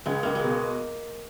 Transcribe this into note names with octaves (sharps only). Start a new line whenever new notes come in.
C#2 G#3
C#2 A#3
G#3
B2